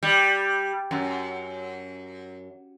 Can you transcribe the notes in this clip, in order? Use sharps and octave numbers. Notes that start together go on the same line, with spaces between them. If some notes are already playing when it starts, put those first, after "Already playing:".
G3
F#2